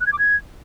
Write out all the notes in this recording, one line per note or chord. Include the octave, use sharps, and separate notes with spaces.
F#6
G#6
D6
G#6